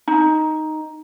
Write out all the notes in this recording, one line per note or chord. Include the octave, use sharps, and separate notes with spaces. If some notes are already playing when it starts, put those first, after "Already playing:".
D#4